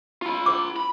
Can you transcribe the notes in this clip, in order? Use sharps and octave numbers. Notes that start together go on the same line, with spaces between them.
F4 B5
C5 D6
B5